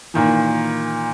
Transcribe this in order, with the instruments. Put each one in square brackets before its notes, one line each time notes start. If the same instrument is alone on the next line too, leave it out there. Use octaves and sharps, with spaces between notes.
[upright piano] A#2 D#3 E3